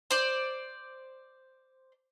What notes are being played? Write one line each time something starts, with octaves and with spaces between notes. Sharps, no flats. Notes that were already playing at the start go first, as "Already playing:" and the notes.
C5 D5